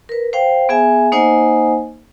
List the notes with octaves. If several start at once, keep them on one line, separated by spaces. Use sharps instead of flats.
A#4 B4
C5 F5 G5
B3 G#4 E5 G#5
A#3 D#4 C5 D#5 F#5 G#5